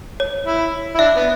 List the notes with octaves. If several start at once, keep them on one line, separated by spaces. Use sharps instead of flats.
C#5
E4
E4
D4 E5
B3